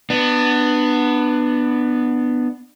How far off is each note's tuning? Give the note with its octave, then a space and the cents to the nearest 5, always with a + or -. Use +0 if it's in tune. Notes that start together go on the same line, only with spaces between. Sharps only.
B3 +0 D4 +25